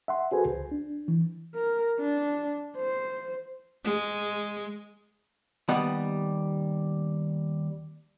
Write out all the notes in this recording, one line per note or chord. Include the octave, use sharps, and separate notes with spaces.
E5 F#5 C6
F#4 G#4 A4 B4 C5 G#5
C#2
D4
E3
A#4
D4
C5
G#3
D#2 G3 B3 D#5 F#5